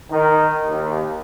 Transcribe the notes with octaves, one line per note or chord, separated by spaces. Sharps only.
D#3
D#2